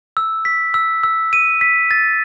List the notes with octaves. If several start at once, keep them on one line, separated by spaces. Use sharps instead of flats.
E6
B6
E6
E6
D#7
B6
A6